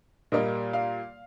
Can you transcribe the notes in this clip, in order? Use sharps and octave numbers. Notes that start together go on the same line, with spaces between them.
A#2 G3 A#3 D#5
F5